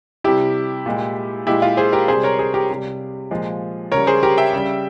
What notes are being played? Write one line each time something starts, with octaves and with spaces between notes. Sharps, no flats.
C3 G3 E4 G4
A#2 G#3
A#2 G#3 E4 G4
F4
G#4 C5
G4 A#4
C3 G3 G#4 C5
A#4 C#5
G#4 C5
G4 A#4
C3 G3
A#2 F3 G#3
C#3 G3 A#4 C#5
G#4 C5
G4 A#4
E5 G5
C#3 G3